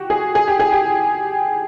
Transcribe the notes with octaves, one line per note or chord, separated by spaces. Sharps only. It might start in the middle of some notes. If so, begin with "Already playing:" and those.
Already playing: F#4 G4
G#4
G#4
G4
G#4
G4